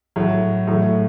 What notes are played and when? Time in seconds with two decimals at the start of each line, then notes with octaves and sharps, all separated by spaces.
0.16 A2 F#3 A3
0.67 A2 F#3 A3